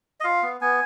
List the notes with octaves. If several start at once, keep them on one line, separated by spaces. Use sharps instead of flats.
D#5
F4 F5
B3
B3 G#5